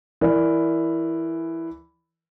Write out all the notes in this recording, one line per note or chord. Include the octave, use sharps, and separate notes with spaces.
E3 A#4 D5